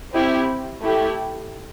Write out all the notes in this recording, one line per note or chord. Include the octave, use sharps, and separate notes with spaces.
C4 E4 G4
A3 E4 G4